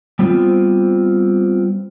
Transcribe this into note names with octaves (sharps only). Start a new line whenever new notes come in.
G3 B3 C4 F4